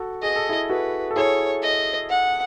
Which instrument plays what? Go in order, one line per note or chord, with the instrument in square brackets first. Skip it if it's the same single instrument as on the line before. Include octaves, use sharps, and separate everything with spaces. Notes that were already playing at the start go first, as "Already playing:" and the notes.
Already playing: [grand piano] F#4 A4
[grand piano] G#4 [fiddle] D#5
[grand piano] A4
E4 G#4
[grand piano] F#4 A4 [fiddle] B4
[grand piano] A4
[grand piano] E4 G#4 [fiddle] C#5
[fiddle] D#5
F#5